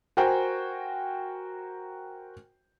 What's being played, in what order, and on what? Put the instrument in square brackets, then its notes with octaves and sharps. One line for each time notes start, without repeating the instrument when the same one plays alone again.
[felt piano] F#4 A#4 C5 G5 G#5